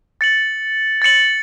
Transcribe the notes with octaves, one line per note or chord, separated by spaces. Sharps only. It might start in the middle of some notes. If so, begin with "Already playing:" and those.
A6 C#7 F#7
A6 C#7 F#7